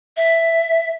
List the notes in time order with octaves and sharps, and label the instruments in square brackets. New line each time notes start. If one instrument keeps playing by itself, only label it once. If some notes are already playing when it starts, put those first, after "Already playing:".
[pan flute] E5